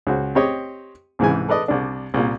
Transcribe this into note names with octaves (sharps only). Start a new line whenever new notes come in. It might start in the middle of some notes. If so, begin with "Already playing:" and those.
C#2 F#4 C5
C4 G4 C#5 D#5
C2 G#2 E3 G#5
A4 B4 D5 D#5
C2 D4
C2 A#2